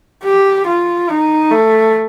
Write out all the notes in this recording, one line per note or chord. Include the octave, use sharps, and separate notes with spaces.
G4
F4
D#4
A3